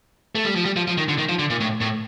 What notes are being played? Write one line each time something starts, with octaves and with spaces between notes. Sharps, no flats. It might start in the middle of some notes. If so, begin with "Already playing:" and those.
A3
G3
F3
G3
F3
F3
D#3
D3
D#3
F3
D3
A#2
A2
A2